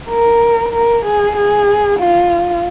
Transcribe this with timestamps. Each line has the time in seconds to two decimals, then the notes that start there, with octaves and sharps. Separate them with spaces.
0.09 A#4
0.73 A#4
1.05 G#4
1.36 G#4
1.99 F4